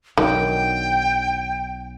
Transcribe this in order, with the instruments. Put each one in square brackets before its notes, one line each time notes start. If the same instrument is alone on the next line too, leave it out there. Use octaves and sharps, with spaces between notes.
[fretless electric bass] B1 F#3 D4 [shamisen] D#3 [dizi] G5